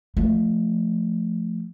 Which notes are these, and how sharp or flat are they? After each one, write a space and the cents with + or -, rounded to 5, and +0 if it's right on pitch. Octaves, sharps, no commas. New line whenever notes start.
F3 +0 A3 +0